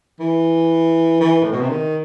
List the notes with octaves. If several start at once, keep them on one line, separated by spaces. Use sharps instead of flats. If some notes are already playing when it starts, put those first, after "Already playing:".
E3
E3
A2
B2
C3
D#3